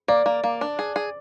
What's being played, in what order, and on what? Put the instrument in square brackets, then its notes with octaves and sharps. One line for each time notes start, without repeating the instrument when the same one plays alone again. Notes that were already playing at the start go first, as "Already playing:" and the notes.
[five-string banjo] A#3 [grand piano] D5
[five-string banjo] A#3
A#3
D4
G#4
G#4